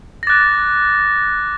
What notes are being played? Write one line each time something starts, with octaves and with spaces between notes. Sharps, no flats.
A#6
D6 F#6 A6